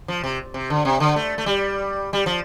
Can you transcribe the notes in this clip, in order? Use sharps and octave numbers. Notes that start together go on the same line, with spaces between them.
F3
C3
C3
D3
C3
D3
A3
A3
G3
G3
F3